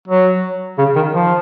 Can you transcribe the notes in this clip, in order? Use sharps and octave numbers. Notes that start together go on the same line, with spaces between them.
F#3
C#3
D#3
F3